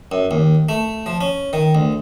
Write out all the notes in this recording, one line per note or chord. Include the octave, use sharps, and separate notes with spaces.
F#2
D#2
A3
F3
C#4
D#3
D2